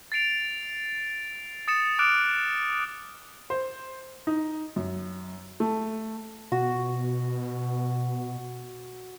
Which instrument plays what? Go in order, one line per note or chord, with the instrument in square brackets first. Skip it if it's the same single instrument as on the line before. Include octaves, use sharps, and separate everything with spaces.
[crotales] A6 C7 D7 F7
D#6 A6 C#7 E7
D6 F6 F#6 D7
[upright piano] C5
D#4
F#2
A3
[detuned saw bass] B2 [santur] F#4